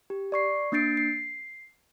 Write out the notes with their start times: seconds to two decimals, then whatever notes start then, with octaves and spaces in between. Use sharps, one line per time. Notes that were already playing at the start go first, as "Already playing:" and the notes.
0.10 G4
0.32 D5 C#6 C7
0.72 A#3 D4 G6 A6 C7 D7
0.97 C7